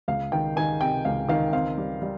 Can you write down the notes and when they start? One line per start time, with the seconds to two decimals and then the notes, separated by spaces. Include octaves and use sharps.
0.08 C#2 F5
0.32 D#3 G5
0.57 D#3 G#5
0.81 C3 G5
1.05 C#2 F5
1.29 D#3 F5
1.53 C4 F5
1.78 G3
2.02 G3